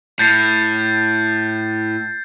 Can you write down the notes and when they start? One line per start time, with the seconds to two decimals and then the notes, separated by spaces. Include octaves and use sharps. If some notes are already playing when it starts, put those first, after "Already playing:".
0.19 A2 G6 A6 C7